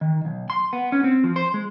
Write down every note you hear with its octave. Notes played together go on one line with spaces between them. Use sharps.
D#3
B1
C6
B3
C#4
C4
F3
C5
G#3